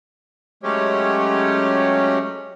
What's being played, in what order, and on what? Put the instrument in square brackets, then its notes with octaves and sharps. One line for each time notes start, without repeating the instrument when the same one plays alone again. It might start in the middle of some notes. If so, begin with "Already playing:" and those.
[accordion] F#3 G#3 A3 C#4 G4 C#5